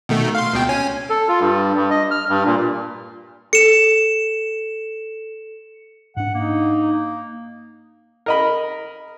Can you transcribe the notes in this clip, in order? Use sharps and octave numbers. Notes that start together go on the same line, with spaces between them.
B2 D#3 A3
F5 C6
C#2 B2 G5
C#4 G#5
A4
F4
G2
G2
D#5
F6
G2
A#2
A4 C#7 E7
G#2 D4 F#5
A#3 D#4
A#4 D#5 B5